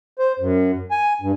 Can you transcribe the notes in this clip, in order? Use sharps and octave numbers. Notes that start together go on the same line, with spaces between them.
C5
F#2
G#5
G2